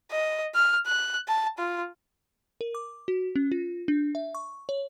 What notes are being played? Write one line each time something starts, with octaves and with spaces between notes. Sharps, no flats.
D#5
F6
F#6
A5
F4
A#4
D6
F#4
C#4
F4
D4
E5
C#6
C#5